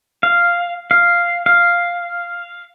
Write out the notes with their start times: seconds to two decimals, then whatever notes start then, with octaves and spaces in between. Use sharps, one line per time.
0.23 F5
0.91 F5
1.46 F5